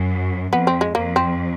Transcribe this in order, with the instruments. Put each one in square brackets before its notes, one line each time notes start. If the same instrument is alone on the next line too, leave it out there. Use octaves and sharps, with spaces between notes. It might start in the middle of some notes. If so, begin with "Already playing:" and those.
Already playing: [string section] F#2
[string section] F2 [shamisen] B3
[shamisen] C4
G#3
[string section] F2 [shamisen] A#3
[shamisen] C4